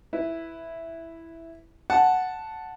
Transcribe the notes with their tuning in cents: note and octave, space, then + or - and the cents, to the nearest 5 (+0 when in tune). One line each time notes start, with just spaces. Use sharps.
E4 +0 B4 +5
F#5 +0 A5 +0